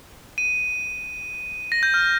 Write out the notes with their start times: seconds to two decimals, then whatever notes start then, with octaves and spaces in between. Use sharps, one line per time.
0.38 D#7
1.72 A#6
1.83 G6
1.94 F6